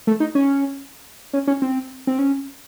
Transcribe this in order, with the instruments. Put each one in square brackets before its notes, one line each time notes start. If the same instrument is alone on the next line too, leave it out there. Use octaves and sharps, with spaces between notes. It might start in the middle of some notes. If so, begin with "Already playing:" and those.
[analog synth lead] A3
D#4
C#4
C#4
C#4
C4
C4
C#4